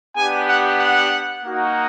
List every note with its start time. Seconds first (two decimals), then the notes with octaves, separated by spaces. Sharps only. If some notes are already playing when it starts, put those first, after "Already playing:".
0.16 B3 D4 G4 G#5
0.47 F#5
0.79 F#5
1.43 A#3 D#4 F#4